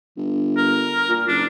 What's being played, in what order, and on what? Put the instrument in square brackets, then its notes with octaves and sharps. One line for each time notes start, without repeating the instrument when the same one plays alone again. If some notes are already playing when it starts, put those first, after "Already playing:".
[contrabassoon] G1
[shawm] A#4
[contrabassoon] A#2
[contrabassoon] F#1 [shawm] D4